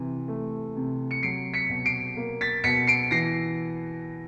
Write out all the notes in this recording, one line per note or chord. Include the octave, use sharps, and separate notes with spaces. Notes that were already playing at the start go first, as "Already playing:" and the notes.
Already playing: C3 E3
A3
C3
C#7
F#3 C7 D7
B6 C#7
B2
C7 D7
A#3
A6 B6
B2 B6 C#7
C7 D7
E3 A#6 C7